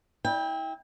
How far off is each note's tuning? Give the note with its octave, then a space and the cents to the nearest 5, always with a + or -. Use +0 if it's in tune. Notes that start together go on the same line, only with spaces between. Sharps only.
E4 -30 G5 +20